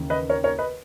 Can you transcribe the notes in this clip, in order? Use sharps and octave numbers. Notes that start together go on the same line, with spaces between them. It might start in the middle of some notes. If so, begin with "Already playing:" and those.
Already playing: D#2 C#3 E3
B4 D#5
A#4 C#5
A#4 C#5
B4 D#5